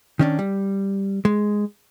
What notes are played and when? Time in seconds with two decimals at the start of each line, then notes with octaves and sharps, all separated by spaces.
0.19 D#3 C#4 D4
0.39 G3
1.25 G#3